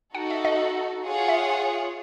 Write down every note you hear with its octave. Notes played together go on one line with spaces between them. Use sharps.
D#4 F#4 A4 F#5
E5
D#5
F4 G#4 C#5 F#5
E5